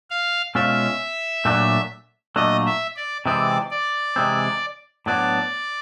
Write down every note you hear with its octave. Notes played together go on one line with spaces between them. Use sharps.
F5
B2 G#3 C#4 F4 E5
A#2 F#3 A3 D4
A#2 F#3 A3 D4 D#5
E5
D5
C3 E3 G#3 C4 D5
D5
C3 E3 G#3 C4
A2 F#3 B3 D4 F#4 D5